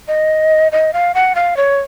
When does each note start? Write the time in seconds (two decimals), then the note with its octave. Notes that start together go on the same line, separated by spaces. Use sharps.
0.08 D#5
0.72 D#5
0.93 F5
1.14 F#5
1.35 F5
1.57 C#5